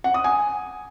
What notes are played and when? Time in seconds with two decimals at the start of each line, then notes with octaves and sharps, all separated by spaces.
0.04 F#5
0.14 D#6
0.24 G#5